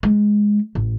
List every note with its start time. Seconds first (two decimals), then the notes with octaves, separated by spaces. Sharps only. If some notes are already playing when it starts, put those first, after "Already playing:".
0.03 G#3
0.75 A1